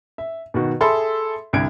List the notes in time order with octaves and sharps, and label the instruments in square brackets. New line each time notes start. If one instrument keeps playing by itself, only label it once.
[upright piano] E5
B2 D#3 F#4
G#4 A4 E5 B5 C6 E6
C2 G2 D3 G#6 D7